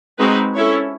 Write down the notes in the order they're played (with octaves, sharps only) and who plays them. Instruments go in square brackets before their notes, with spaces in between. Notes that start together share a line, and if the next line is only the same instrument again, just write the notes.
[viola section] G#3 C4 D#4 F#4 B4
C#4 E4 A4 C#5